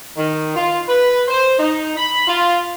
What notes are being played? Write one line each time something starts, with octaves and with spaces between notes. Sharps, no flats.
D#3
F4
B4
C5
D#4
B5
F4